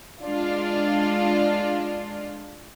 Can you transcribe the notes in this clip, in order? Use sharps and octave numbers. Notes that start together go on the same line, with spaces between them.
G#3 D4 F4